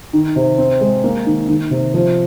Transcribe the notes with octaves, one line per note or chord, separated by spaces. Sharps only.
D#3
C3
C4
G#3
A#3
D#3
D#3
C3
F3